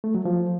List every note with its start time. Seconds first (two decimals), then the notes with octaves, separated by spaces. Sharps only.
0.04 A3
0.15 F#3
0.25 F3